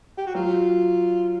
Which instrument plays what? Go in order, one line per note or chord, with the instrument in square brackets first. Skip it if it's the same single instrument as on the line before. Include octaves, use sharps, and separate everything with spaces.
[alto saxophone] G4
F#4
[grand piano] F#3 [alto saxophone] F4